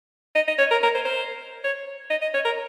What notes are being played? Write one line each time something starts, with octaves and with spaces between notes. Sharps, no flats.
D#5
D#5
C#5
A#4
A#4
C5
C5
C#5
D#5
D#5
C#5
A#4